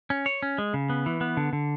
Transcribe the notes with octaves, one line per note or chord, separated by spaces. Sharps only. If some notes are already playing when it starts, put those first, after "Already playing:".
C#4
C#5
C#4
G#3
C#3
B3
E3
B3
D3
D3